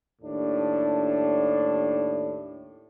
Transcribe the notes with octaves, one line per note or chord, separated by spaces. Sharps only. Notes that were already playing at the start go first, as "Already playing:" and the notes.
D#2 A2 D4